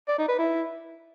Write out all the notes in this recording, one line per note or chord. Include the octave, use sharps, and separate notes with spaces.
D5
D#4
B4
E4